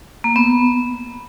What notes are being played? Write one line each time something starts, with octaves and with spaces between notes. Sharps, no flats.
A#3
B3